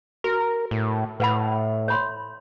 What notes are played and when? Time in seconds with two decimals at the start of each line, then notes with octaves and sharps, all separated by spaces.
0.24 F#4 A#4
0.71 A2
1.20 A2 B4 F#5 B5
1.88 C#5 B5 C6